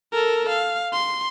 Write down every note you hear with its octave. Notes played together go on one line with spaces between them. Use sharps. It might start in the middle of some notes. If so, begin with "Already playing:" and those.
A4 A#4
F5
C6